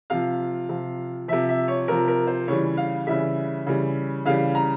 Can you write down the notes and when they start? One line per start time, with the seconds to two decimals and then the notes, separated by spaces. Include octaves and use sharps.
0.10 C3 F3 F5
0.69 C3 F3
1.28 C3 F3 E5
1.49 E5
1.68 C#5
1.88 C3 F3 A#4
2.08 A#4
2.27 C5
2.48 C#3 E3 G3 C#5
2.77 F5
3.07 C#3 E3 G3 E5
3.67 C#3 E3 G3
4.26 C#3 E3 G3 F5
4.55 A#5